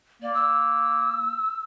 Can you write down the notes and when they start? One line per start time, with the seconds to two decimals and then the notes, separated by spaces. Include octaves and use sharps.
0.22 A#3 D5
0.34 E6